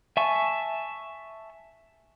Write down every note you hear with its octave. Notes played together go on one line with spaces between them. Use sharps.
E5 G#5 A5 C#6